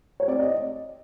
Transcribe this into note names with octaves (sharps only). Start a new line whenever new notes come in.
C#5
C4 D5
D#5